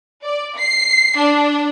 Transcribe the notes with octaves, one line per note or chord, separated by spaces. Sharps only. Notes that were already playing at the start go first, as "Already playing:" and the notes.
D5
C7
D4